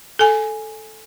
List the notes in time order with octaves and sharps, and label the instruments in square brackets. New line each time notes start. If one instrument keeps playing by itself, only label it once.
[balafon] A4 G#5